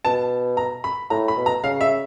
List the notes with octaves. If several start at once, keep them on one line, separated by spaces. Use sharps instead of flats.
B2 A5
A#5
B5
A2 A#5
B5
B2
A#5
C#3 F5
E5